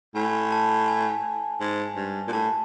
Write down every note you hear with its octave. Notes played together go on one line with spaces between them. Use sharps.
A2 G#5
A5
G#5
G#2
G2
A#2
A2 A5